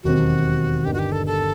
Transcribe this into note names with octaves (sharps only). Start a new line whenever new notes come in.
E1 D#2 D#3 F#3 C4 F#4
G1 G2 D#3 G4
F#4
G4
A4
A4